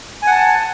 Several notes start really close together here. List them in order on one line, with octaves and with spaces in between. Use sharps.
G#5 F#5 A5